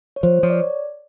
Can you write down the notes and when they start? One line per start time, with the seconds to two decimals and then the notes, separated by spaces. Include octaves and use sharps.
0.16 C#5
0.23 F3 C5
0.43 F3 C#5
0.50 D5